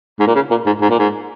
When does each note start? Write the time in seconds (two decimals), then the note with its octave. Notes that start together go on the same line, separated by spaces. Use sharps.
0.20 G#2
0.27 A#2
0.35 C#3
0.50 A#2
0.66 G#2
0.81 G#2
0.90 A#2
0.99 G#2